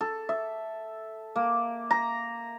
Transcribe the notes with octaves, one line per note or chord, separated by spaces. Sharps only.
A4
E5
A#3
A#5